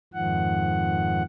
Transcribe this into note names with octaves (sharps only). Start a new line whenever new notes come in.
F2 G#2 D#3 F3 F#5